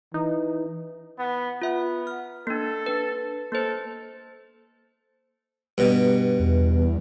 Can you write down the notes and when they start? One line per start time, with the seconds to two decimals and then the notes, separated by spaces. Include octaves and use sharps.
0.14 E3 D#4
1.19 B3
1.62 B3 F4 E5
2.07 F6
2.47 A#3 D4 A4
2.86 D4 B4
3.52 A#3 A4 C5
5.78 G2 B2
6.40 E2